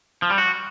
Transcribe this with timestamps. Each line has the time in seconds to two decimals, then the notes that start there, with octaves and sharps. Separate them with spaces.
0.22 F3
0.30 G3
0.38 F#4